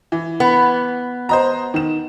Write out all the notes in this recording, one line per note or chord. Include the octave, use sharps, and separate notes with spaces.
E3
B3
C5 D#5 A#5
D#3 E7